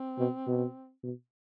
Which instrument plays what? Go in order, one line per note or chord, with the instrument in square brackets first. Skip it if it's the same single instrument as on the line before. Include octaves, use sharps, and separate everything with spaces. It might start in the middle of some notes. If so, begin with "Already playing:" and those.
Already playing: [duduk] C4
[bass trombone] B2
B2
B2